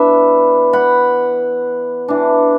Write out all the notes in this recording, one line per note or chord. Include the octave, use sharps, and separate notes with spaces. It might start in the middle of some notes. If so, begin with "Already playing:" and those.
Already playing: E3 B3 D4 E5
F#5 B5
E3 D4